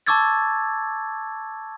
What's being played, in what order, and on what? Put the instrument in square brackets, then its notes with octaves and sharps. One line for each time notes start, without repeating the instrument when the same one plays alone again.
[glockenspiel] A5 C#6 D6 E6 G#6 A6